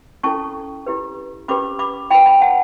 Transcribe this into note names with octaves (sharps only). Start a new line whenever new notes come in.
C#4 E4 A4 A5 C#6
E4 G4 B4
C#4 G4 B4 B5 D6
B5 D6
E4 B4 G5 B5
G5 B5
F#5 A5